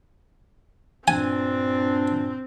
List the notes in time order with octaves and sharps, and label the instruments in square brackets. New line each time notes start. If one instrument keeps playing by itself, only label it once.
[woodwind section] G2 A#2 D4 [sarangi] C4 [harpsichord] G#5